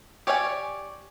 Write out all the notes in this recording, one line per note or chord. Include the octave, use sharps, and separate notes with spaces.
G4 C#5 D5 E5 G#5